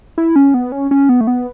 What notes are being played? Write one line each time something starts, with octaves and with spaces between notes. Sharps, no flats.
E4
C#4
B3
C#4
C#4
B3
A3
B3